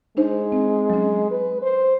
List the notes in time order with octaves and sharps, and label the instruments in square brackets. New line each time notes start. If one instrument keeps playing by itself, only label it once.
[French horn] G#3 [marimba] D4 D#4 C5
[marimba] C4
F#3 C#4
[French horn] B4
C5